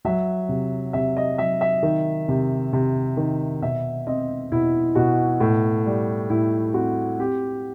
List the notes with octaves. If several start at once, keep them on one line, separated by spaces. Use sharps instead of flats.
F#3 E5
C3
C3 E5
D#5
F#3 E5
E5
D#3
C3
C3
D#3
B2 E5
C4 D#5
B2 E4
B2 F#4
A2
G3
A2 E4
C4 F#4
C4 G4